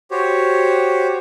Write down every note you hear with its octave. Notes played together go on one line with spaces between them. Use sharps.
F#4 G4 C5 C#5